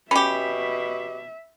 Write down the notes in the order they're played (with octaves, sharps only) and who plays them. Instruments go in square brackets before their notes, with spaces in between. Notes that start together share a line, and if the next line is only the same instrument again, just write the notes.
[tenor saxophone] B2 [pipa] C#4 G4 [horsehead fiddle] E5 [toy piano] B5